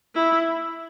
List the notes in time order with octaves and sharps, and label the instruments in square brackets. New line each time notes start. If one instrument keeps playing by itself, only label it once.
[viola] E4